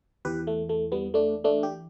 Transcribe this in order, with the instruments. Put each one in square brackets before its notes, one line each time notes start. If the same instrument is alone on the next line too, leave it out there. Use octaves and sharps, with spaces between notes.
[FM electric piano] E2 E3 G4 B4
A3
A3
G3 B3
A3 D4
A3 D4
G4